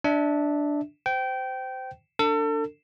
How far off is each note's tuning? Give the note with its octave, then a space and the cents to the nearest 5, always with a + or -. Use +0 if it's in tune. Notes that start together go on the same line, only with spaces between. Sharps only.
D4 +0 E5 -25
C5 -20 G5 -20
D4 +0 A4 +35